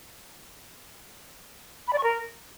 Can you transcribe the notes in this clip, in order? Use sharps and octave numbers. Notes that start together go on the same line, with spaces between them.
B5
D5
C#6
A#4